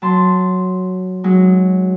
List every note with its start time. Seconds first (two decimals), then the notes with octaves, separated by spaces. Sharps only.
0.02 F#3 A5 C6
1.24 F#3 G#3 D#4